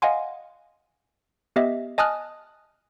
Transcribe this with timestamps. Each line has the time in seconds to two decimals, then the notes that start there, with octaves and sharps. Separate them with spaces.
0.02 D#5 F5 F#5 G#5 C6
1.56 B3 G4 D#5 E5
1.98 D#5 G#5 A5 D#6 F6 F#6